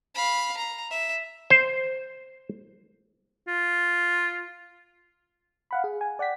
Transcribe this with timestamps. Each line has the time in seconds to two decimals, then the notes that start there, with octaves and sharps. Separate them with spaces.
0.15 F5 B5
0.57 A#5
0.91 E5
1.50 C5
3.48 F4
5.71 F5 F#5 B5
5.84 G#4
6.01 G#5
6.19 D5 F#5 G5 B6